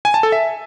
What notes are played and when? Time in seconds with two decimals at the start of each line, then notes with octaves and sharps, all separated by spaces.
0.05 G#5
0.14 A5
0.23 A4
0.32 E5